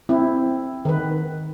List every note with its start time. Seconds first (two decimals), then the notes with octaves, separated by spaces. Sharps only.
0.09 C4 E4
0.85 D#3 B4